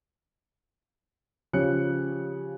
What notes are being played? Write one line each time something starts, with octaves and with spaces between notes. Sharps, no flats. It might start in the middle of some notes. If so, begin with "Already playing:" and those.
C#3 F3 G4 C#5 F#6 C#7